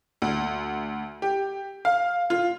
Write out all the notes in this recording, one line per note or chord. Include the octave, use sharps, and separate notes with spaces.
D2
G4
F5
F4